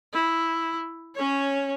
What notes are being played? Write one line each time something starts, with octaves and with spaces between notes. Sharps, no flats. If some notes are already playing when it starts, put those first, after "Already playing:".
E4
C#4 C#5